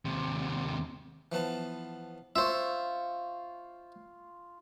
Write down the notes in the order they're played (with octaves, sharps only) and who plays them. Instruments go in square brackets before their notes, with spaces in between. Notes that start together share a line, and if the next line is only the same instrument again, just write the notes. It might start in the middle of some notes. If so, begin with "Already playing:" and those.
[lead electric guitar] D#2 C3
[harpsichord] E3 F3 B3 A5
[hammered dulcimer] F4 C#6 [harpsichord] C5 E5